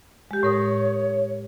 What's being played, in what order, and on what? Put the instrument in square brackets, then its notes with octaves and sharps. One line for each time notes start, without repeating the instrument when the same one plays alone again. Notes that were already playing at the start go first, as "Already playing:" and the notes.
[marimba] G#3 G4
[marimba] A2 A#4 D#6 [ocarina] C#5